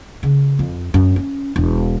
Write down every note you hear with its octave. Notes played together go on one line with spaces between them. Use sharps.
C#3
F2
F#2
C#4
E1